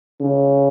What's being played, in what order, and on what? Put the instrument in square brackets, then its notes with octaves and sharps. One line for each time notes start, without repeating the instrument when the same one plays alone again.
[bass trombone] C#3